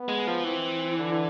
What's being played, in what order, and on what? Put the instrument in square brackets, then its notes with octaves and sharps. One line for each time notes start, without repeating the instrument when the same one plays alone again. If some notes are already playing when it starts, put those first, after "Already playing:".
Already playing: [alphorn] B3
[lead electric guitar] G#3
F3
[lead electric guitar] E3 [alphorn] C4
[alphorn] D3